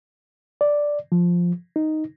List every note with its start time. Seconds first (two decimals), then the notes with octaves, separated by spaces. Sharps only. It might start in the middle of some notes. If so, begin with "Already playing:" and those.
0.61 D5
1.12 F3
1.76 D#4